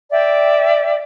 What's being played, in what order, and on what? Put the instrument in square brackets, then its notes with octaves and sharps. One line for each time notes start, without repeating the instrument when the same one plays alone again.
[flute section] D5 E5 G5